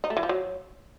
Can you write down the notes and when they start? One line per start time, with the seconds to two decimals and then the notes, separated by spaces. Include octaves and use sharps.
0.04 D#4
0.10 A3
0.17 E3
0.23 F3
0.29 F#3